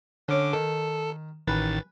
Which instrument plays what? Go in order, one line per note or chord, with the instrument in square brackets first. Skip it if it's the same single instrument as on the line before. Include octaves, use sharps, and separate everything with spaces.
[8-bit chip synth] D3 D6 [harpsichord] C#4 C#5
[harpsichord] D#3 [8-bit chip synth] A4
[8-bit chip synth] A1 D#3 A6 [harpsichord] B4 G#5